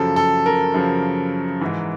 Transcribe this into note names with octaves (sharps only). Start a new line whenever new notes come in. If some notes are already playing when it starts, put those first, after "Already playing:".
Already playing: F#2 C#3 F3 A4
A4
A#4
F#2 C#3 F3
G#2 E3